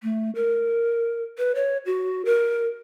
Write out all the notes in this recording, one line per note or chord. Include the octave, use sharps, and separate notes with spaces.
A3
A#4
B4
C#5
F#4
A#4